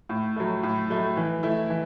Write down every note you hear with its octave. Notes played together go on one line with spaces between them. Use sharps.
A2
F#3 A3
A2
F#3 A3
E3
A3 E4
E3